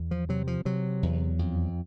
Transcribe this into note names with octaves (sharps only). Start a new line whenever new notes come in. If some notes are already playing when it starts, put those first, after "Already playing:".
Already playing: E2
F3
C3 F#3
F3
C3 F#3
E2
F2